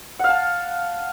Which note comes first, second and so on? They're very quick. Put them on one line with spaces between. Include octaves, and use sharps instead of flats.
F#5 F5 A5